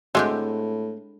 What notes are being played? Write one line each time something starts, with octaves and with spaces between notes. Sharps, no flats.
A2 G#3 C4 D4 F#4 G4 E5